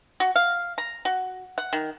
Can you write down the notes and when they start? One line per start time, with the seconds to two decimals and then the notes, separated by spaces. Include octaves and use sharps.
0.20 F#4
0.36 F5
0.78 A#5
1.05 F#4
1.58 F#5
1.73 D#3